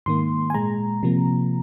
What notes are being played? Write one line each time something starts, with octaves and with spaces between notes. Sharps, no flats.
G#2 D#3 A#3 C6
G#5
A#2 G#3 A#5
C3 F3 A#3